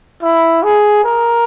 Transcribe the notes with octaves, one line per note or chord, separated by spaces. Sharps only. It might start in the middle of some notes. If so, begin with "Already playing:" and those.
E4
G#4
A#4